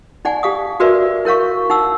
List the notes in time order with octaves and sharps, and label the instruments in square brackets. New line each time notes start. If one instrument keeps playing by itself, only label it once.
[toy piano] D#4 D5 F#5 G#5
G4 F5 D#6
F#4 A#4 B4 D5 E5
E4 A#4 C#5 F5 C#6
D#4 F#5 E6